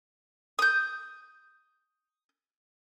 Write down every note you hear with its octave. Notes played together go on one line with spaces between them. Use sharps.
D#6 G6